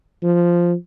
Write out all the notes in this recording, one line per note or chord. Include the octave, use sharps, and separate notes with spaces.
F3